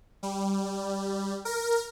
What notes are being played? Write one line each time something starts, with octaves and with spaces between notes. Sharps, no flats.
G3
A#4